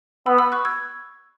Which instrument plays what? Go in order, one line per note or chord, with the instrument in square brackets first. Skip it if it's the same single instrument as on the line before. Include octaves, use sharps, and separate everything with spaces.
[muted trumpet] B3 [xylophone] B5 E6
[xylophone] B5 E6
C#6 F#6
E6 G#6